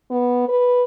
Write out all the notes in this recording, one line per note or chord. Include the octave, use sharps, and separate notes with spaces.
B3
B4